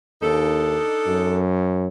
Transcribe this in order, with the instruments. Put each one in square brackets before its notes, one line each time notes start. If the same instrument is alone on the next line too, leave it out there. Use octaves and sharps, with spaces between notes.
[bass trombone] D#2 [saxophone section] D4 D#4 A4
[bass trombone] F#2